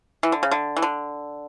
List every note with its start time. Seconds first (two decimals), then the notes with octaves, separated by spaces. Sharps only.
0.23 E3
0.32 D3
0.43 C#3
0.51 D3
0.77 E3
0.82 D3